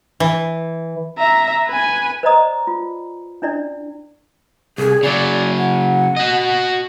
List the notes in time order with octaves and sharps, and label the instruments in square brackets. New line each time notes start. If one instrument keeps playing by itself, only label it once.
[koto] E3
[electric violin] E5 A#5
B4 G#5
[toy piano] B4 C5 D5 D#5 A#5 D#6
F4
C#4 D4 E4 D5
[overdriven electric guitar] C2 [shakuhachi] G#4
[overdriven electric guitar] C#3 F#3 [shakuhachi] D5
[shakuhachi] F#5
[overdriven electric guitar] F#4 D#5